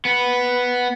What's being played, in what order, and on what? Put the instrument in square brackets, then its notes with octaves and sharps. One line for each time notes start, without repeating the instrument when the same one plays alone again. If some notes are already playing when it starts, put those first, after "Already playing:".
[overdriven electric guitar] B3